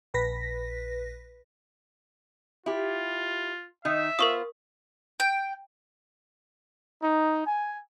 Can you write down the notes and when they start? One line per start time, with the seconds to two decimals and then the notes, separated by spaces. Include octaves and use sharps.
0.14 A#1 B4 A#6 B6
2.66 E4 F4 G4
3.85 D#3 D#4 E5
4.19 B3 F4 A#4 C5 C#6 D#6
5.20 G5
7.03 D#4
7.46 G#5